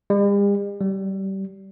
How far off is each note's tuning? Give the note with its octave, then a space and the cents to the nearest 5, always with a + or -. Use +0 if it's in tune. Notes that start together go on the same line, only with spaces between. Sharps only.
G3 +45
G3 -25